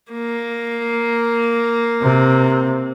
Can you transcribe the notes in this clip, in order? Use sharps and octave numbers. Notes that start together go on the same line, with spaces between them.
A#3
C3